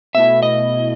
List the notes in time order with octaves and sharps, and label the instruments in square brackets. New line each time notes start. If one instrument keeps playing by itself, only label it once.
[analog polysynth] B2 A3 E4 [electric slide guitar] E5
[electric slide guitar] D#5